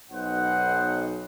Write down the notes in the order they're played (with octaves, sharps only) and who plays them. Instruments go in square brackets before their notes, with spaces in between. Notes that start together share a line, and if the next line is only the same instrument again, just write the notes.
[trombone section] B1 [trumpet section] C5 D#5 F#5